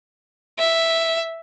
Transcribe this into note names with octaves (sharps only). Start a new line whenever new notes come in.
E5